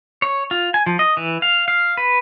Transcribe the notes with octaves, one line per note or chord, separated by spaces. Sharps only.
C#5
F4
G#5
F3
D#5
E3
F5
F5
B4